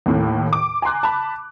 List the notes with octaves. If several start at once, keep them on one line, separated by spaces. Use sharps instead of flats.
D#2 A2
D6
G#5 A#5 C6 F#6
A5 B5